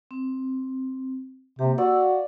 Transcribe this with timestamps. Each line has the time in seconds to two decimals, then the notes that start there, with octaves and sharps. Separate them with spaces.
0.11 C4
1.59 C3 A#3 G4
1.78 F#4 D5 E6
2.01 F5